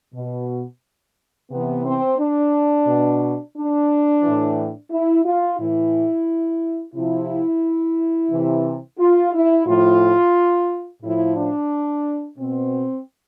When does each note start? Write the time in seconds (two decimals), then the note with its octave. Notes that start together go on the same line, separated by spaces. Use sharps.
0.15 B2
1.51 C3 E3 B3
1.85 C4
2.19 D4
2.87 B2
3.56 D4
4.23 E3
4.28 A2
4.91 E4
5.25 F4
5.59 A2 E3 E4
6.94 C3 E4
6.99 F3
8.31 C3 E3
8.99 F4
9.33 E4
9.66 A2 F3 F4
11.02 A2 F3 E4
11.36 D4
12.39 B2 C4